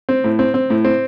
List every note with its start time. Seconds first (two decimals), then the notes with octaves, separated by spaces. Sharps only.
0.09 C4
0.24 A2
0.39 C4
0.54 C4
0.70 A2
0.85 C4